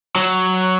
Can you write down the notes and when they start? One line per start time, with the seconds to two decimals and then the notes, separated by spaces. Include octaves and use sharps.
0.16 F#3